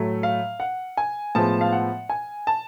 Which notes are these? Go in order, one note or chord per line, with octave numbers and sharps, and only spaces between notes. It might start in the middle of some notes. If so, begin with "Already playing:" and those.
Already playing: A2 F#3 A3
F5
F#5
G#5
A2 F3 G#3 B3 A5
F5
F#5
G#5
A5